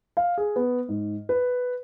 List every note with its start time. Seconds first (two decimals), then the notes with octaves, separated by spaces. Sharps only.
0.17 F5
0.38 G#4
0.56 B3
0.88 G#2
1.29 B4